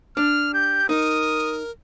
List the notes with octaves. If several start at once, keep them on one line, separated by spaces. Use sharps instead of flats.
D4 F6
G4 G6
D#4 A#4 D#6